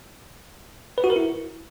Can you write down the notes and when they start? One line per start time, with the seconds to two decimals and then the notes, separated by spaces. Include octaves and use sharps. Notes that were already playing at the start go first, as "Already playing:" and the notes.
0.98 B4
1.04 F#4
1.10 A#4
1.16 E4